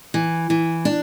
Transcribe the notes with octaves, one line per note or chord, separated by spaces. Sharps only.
E3
E3
D4